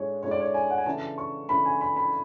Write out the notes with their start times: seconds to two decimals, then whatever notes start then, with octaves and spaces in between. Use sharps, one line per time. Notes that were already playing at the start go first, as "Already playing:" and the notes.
Already playing: A2 G#3 D4 C#5
0.23 A2 G#3 D4 C#5
0.31 D5
0.40 C#5
0.54 G#5
0.70 F#5
0.78 G#5
0.86 C#3 E3 A3 D4 A5
1.18 C#6
1.49 C#3 E3 A3 D4 B5
1.65 G#5
1.81 B5
1.96 B5